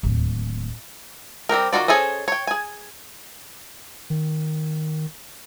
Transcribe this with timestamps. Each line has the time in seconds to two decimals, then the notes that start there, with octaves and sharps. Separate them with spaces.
0.03 D1 D#2
1.49 G3 C4 G4 A#4
1.73 D#3 F4 F#4 D5
1.88 C#4 G#4 A4 C5 D#5
2.28 C#5 G5
2.47 G#4 G#5
4.10 D#3